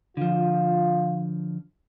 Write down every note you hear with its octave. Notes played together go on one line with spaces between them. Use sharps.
D3 F3 F4